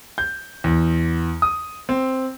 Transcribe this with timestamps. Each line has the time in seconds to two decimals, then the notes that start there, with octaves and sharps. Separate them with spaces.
0.18 G6
0.64 E2
1.42 D#6
1.89 C4